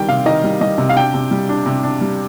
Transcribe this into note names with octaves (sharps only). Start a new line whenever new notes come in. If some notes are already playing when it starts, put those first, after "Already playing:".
Already playing: D#3 G3 G5
C3 F5
D#3 D#5
G3
G3 D#5
C3
F5
D4 G5
C3
G3
D4
C3
D4
G3